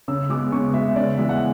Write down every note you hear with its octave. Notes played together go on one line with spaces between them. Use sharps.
C#3 E6
G#3 B3 D6
C#3 C#6
G#3 B3 E5
C#3 D5
E3 G#3 B3 E5
F#5